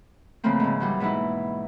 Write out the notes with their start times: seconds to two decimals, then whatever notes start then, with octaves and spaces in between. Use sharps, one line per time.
0.44 C#3 E3 F3 A3 A#3 C4
0.60 G#2 C#3
0.80 E3 F#3 G3
1.00 G#2 B2 E3 D#4 E4